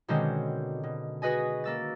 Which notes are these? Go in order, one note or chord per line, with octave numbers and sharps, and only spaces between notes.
B2 D3 D#3 G#3 C4 C#4
B2
F#4 G#4 B4 D#5 G#5
A#3 E6 A6